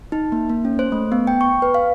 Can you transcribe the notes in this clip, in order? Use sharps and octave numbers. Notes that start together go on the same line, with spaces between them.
D#4
A#3
A#3
C#4
C5
A3
B3
G5
C#6
B4
F5